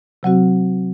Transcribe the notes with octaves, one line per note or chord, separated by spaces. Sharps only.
C3 F#3 C4 F#4